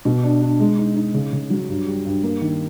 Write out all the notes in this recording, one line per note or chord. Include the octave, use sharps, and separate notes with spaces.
B2
D4
D4
G#3
D#4
D#4
C#3
C#3
F#3
G2
G3
G2
A#3
D#3